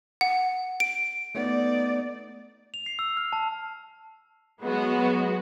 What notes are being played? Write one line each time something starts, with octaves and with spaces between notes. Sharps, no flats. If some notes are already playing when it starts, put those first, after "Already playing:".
F#5
D7
A3 B3 D#4 D5
F7
C7
E6
F6
A5
F#3 G#3 B3 F#4